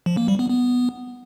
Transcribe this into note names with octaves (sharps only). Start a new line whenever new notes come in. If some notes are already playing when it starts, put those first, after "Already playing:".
F3
A#3
G3
B3
B3